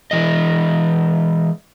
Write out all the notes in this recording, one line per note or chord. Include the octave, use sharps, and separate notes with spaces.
E3 G#3 D#5